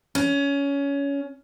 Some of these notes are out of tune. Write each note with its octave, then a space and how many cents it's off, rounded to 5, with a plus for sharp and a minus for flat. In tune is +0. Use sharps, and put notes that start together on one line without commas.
C#4 +20